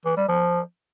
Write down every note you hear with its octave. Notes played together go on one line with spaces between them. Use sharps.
E3
G3
F3